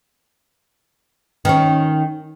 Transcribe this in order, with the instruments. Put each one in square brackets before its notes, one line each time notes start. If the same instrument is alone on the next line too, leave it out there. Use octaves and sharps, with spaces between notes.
[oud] D#3 C#4